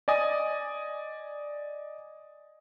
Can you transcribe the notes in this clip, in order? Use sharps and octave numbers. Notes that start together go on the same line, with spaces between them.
D5 D#5 G#5 D#6